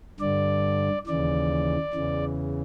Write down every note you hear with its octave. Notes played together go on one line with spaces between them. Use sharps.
G2 D3 D5
D#2 C#3 E3 D5
E2 C#3 E3